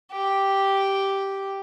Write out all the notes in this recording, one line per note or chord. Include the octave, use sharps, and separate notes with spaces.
G4